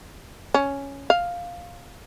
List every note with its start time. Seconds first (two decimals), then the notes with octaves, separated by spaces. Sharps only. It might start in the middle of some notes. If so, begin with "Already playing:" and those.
0.54 C#4
1.10 F5